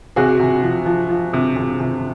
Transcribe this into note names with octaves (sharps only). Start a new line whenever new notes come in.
C3 F#4 G#4
C3
F3
F3
F3
C3
C3
C3